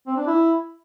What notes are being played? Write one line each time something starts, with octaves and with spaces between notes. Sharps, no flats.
C4
D4
E4